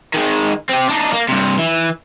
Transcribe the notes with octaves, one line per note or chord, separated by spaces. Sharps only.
D#3 G#3
C4 G4
D4 D#4
A#3
G2 C3
E3